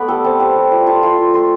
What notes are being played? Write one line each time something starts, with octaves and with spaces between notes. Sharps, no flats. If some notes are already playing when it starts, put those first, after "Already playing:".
Already playing: A3 B3 B4 D5
G3 A4
C4 A4
G3 B4
G3
F4 D5
F4 A5
F4 C6
F4
A3 C6